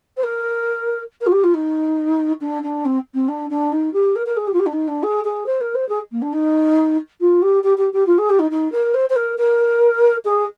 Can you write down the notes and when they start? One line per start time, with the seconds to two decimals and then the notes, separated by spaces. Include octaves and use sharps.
0.17 C5
0.23 A#4
1.21 A#4
1.26 F4
1.32 G4
1.43 F4
1.54 D#4
2.41 D4
2.63 D4
2.85 C4
3.14 C4
3.28 D4
3.50 D4
3.72 D#4
3.93 G4
4.15 A#4
4.26 A#4
4.36 G#4
4.47 G4
4.53 F4
4.59 G4
4.66 D4
4.72 D#4
4.87 D4
5.03 G#4
5.24 G#4
5.46 C5
5.61 A#4
5.75 C5
5.89 G#4
6.11 A#3
6.22 D4
6.32 D#4
7.20 F4
7.42 G4
7.63 G4
7.77 G4
7.93 G4
8.06 F4
8.18 G#4
8.29 G4
8.39 D#4
8.51 D#4
8.72 A#4
8.94 C5
9.09 C5
9.16 A#4
9.38 A#4
10.24 G#4